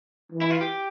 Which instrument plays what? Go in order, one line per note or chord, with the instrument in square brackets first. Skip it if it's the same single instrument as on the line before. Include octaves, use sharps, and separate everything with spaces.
[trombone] E3
[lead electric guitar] E4
F4
G4